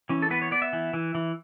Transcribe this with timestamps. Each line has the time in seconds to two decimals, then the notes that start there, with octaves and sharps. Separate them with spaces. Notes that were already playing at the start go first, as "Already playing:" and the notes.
0.09 E3 C#4
0.22 A4
0.31 B3 B4
0.42 C#5
0.51 B3 D5
0.62 E5
0.73 E3
0.94 E3
1.15 E3